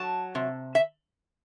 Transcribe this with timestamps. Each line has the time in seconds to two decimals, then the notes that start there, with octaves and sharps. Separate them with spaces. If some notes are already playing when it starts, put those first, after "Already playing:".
Already playing: F#3 A5
0.35 C3
0.75 E5